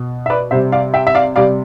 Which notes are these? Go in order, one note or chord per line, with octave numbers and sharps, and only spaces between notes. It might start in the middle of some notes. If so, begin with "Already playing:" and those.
Already playing: B2
E5
B4 D5
C3 G3 C5 E5
D5 F5
E5 G5
E5
D5 F5
C3 G3 D5 F5